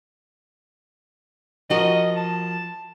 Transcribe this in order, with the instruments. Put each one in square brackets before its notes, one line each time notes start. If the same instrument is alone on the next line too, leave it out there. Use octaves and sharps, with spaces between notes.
[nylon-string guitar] F3 F#4 A#4 [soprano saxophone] D#5
[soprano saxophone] A5